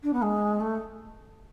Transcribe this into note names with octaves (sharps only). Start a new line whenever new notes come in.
D4
B3
G#3
A3